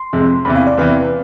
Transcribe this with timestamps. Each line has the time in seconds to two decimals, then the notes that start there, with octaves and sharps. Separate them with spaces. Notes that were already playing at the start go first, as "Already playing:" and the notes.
Already playing: C6
0.13 F2 C3 G#3
0.45 E2 C3 E3 B5
0.56 F5
0.67 D5
0.77 E2 C3 E3 B4